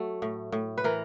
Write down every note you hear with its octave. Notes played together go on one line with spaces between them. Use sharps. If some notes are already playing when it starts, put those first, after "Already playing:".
Already playing: F#3 A3 A4
A2
A2
B4
E3 A#4